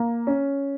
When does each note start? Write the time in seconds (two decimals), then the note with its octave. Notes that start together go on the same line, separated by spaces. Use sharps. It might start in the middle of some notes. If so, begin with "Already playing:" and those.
Already playing: A#3
0.27 C#4